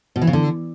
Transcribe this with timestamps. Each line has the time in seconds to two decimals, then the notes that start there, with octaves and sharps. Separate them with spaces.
0.16 B2
0.22 E3
0.27 C#3
0.33 D3